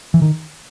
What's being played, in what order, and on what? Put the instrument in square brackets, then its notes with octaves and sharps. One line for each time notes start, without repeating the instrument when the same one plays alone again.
[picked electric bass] E3
D#3